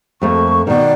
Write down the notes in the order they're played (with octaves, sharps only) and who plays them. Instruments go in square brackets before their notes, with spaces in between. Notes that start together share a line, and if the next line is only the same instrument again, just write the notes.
[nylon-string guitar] F2 A3 A#3 [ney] C#6
[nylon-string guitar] B2 D#3 [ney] D5